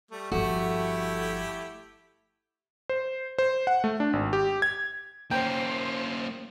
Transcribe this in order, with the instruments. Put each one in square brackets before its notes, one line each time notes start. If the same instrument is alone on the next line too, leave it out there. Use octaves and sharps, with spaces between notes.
[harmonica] G3 A3
[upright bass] G1 F3 [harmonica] A3 E4 G4 [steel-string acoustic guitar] F#4 [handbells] A4
[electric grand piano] C5
C5
F#5
A3
D4
G#1
G4
G#6
[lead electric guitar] A#3 C#4 [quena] C5 [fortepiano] G5